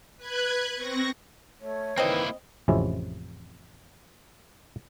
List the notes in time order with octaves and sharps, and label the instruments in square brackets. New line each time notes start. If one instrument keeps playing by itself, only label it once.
[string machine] B4 F#6 G#6
C4 C#6 A#6
[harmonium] A3 [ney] C#5
[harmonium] D#3 E3 B4 [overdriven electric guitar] A#3 E4 [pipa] C4 D#5
[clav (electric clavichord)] A1 F2 C3 G#3 C#4 E4